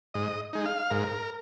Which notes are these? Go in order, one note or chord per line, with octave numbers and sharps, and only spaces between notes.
G#2 D#5
G#3 D#4
F5
G#2 A#4